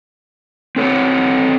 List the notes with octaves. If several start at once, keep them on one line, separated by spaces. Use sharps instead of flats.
C4 A4 C#5